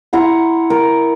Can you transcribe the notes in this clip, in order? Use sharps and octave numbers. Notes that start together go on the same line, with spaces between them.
E4 F#5 A#5 C6
A#4